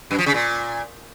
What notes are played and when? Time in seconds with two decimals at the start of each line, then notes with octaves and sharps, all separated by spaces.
0.11 F#2
0.18 F3
0.26 C#3
0.34 A#2